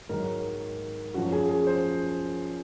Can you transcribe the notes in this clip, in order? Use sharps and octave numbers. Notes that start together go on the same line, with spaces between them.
G#2 D#3 F#3 A#4
F#2 F3 F#4
G#4
G#4
C5